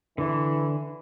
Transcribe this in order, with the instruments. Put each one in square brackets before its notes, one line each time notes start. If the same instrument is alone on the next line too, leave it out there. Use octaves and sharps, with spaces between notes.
[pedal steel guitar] D3 D4 [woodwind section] E3